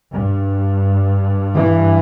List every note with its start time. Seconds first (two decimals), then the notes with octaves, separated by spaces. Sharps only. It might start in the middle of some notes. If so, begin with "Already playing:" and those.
0.11 G2
1.54 E3